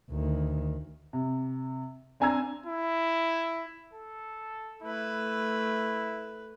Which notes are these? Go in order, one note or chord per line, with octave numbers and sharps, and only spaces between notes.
D2 D#3
C3
C4 D4 G#5 A#5 E6 G#6
E4
A4
A3 E4 B4